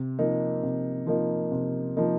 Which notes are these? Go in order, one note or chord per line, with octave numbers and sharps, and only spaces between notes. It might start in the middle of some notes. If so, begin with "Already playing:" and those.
Already playing: C3
F3 A#3 D#4
C3
F3 A#3 D#4
C3
F3 A#3 D#4